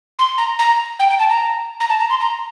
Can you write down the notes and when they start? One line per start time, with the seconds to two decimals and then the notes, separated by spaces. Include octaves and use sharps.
0.19 C6
0.38 A#5
0.59 A#5
0.99 G5
1.09 G5
1.19 A5
1.30 A#5
1.80 A#5
1.90 A5
2.00 A#5
2.10 C6
2.20 A#5